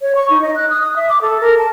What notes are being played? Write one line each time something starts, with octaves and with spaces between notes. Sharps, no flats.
C#5
C#6
D#4
D#5
F#6
D#6
D#6
E5
D6
A4
A#4
A5